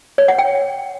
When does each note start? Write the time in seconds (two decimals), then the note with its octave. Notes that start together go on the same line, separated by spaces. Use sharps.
0.18 C#5
0.28 F#5
0.38 G5